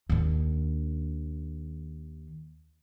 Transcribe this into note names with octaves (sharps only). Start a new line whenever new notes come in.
D#2 D4